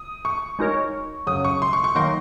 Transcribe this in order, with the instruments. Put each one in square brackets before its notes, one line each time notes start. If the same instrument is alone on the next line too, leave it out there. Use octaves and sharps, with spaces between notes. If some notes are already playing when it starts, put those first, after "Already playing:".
Already playing: [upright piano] D#6
C#6
[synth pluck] G#3 D#4 F#4 A#4 C#5
[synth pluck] F#2 C#3 F#3 [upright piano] D#6
[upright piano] C#6
C6
C#6
C#6
[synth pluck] D#3 F#3 A#3 D#4 A#4 [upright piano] C6